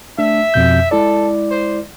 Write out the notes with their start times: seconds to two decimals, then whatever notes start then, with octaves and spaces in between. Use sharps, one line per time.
0.19 A3 D4 E5
0.54 F2 B2 G6
0.91 G#3 E4 A4 D5
1.51 C5